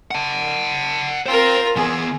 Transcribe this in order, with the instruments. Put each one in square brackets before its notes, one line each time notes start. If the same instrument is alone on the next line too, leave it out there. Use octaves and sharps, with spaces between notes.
[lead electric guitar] F#5 A5
[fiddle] F4 A#4 [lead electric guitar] C5 G5
[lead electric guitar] E3 B3 [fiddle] G#4